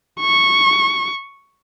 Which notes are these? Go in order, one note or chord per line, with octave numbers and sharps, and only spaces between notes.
C#6